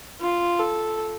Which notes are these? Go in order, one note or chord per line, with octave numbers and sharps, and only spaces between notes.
F4
A4